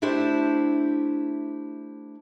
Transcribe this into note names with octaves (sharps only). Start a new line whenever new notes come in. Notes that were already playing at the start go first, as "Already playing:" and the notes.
A3 D4 E4 G4 C5